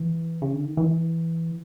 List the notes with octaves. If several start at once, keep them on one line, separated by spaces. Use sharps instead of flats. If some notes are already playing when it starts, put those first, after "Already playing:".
Already playing: E3
C#3
D3
D#3
E3